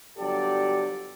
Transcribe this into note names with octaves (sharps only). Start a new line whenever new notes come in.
G1 F#3 G4 A4 D5